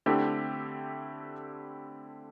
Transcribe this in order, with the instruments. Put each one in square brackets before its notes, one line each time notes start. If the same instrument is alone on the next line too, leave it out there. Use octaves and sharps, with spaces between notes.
[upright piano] D3 A3 C4 E4 G4